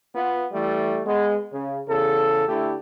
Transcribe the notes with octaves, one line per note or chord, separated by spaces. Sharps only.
B3 F4
E3 G3 A3
G#3 B3
C#3
E2 C#3 A4
D3 A3 E4 G4